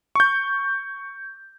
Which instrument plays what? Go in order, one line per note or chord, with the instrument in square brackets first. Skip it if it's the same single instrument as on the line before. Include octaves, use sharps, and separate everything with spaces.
[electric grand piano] C#6 G6